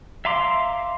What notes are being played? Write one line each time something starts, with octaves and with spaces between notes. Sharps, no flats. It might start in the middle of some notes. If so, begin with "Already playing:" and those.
E5 F5 A#5 C6 D6